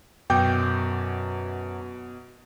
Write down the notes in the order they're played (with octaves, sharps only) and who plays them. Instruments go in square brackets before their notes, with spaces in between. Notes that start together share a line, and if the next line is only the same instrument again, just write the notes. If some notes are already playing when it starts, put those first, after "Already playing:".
[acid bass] F#2 [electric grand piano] B2 D6 G6 [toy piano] G5